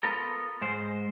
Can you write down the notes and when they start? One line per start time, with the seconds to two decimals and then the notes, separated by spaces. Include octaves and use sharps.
0.03 B3 F4 A4 A#4
0.61 G#2 G#3 C5